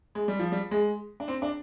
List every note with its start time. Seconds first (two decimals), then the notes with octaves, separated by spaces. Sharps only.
0.15 G#3
0.28 G3
0.39 F3
0.52 G3
0.71 G#3
1.20 D4
1.28 C4
1.42 D4